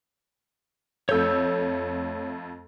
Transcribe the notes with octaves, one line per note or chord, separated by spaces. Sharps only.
F2 A3 C#5 E6 G6